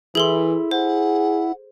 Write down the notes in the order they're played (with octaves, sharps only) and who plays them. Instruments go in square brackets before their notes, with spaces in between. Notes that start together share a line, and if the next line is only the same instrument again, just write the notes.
[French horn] E3 [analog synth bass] E4 [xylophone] G#4 A4 C6
[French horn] G#4 [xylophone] C5 [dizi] F#5